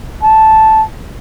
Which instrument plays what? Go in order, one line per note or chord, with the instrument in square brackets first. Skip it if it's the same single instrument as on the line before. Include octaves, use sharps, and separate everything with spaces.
[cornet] A5